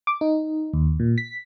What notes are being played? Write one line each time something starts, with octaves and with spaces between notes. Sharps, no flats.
D6
D#4
D#2
A#2
B6